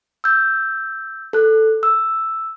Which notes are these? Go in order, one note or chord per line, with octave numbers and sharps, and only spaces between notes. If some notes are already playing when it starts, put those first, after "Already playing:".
E6 G6
A4 F#6
E6